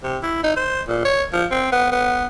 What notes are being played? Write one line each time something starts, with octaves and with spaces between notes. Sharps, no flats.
C3
E4
D#4
C5
A#2
C#5
F3
C4
B3
B3